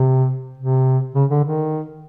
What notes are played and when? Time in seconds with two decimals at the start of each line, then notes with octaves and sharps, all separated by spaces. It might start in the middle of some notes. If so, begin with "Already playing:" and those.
Already playing: C3
0.58 C3
1.15 C#3
1.30 D3
1.44 D#3